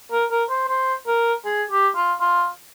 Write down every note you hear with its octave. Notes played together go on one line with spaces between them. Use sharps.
A#4
A#4
C5
C5
A#4
G#4
G4
F4
F4